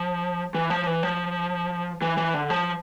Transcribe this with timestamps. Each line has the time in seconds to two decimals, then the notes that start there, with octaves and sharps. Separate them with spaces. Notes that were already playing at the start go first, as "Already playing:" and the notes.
Already playing: F3
0.54 E3
0.70 F3
0.86 E3
1.03 F3
2.02 E3
2.17 E3
2.34 D3
2.50 F3